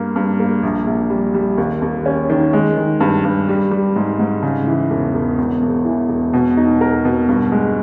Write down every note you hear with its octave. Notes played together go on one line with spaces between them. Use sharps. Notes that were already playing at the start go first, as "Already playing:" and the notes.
Already playing: G2 A#3
G2
A#3
A#1
A#1
G3
G3
D#2
D#2
C#4
D#3
G#3
D#3
G2
G2
G3
G3
G#2
G#2
C#3
E3
E1
E1
E2
E1
E3
E1
B2
D#4
A#4
B2
G2
G#3